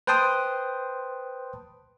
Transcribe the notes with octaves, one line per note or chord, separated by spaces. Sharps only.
B4 C5 G5 A5 C6 D#6